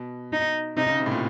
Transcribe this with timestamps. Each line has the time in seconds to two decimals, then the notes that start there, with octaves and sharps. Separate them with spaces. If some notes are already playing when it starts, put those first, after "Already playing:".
Already playing: B2
0.33 D#4
0.77 C3 D#4
0.89 C#3
1.00 C3
1.06 A2
1.11 A#2